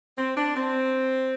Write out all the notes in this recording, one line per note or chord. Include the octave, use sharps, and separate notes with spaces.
C4
D4
C4